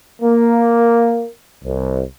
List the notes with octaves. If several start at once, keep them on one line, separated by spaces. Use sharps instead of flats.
A#3
C2